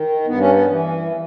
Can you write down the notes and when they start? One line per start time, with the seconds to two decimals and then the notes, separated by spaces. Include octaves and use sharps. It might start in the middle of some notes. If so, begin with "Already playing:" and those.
Already playing: D#3
0.26 G2 B3
0.38 C#4
0.51 B3
0.67 E3